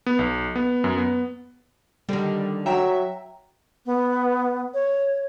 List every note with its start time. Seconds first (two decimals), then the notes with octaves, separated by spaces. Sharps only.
0.06 B3
0.19 B1
0.56 B3
0.84 F#2
0.98 B3
2.09 D3 D#3 G3
2.66 F#3 E5 G5 A#5 E7
3.86 B3
4.74 C#5